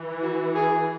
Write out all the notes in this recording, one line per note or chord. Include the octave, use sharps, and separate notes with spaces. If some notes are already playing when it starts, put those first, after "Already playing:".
Already playing: E3
F#4
G#4